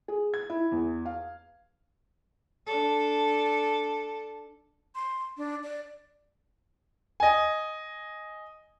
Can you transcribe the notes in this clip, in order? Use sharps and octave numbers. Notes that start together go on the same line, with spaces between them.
G#4
G#6
E4
E2
F5
D4 A4
C6
D4
D5
D#5 G#5